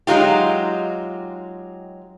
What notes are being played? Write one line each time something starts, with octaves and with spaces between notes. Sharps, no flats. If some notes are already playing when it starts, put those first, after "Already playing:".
F#3 G#3 D#4 F4 G4